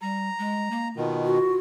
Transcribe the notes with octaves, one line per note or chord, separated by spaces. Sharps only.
G3 A#5
G#3
A#3
B2 D#3 F4
F#4